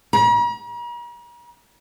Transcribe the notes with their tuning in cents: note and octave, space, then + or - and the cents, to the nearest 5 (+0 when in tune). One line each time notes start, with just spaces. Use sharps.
A#5 +45